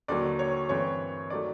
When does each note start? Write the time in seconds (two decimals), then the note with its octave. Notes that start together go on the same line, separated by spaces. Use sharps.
0.08 D#2 D3 F#3 D5
0.39 C#5
0.69 G2 E3 A3 C4 C#5
1.30 D#3 F#3 A3 D5